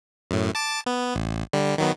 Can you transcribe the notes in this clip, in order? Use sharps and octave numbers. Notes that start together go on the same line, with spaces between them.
F#2 A2
A5 D6 A6
B3
A1
D3 G3
D#3 F#3 B3